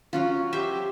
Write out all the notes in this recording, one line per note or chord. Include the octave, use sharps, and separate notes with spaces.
F#3 C#4 F4 C#5
G4 C5 E5